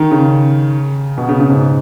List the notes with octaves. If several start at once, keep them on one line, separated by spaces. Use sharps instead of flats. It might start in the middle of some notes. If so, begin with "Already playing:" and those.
Already playing: D#3
C#3
B2
C#3
C#3
G#2